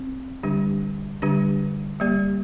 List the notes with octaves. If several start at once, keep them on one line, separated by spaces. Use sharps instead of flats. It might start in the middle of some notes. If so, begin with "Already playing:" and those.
Already playing: C4
D3 G3 D4 G4
D3 G3 D4 G4
G3 A#3 G4 D5